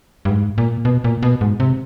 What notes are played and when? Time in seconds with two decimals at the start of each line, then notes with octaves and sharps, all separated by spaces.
0.25 G2
0.30 G#2
0.58 A#2
0.85 B2
1.04 A#2
1.23 B2
1.41 G#2
1.60 C3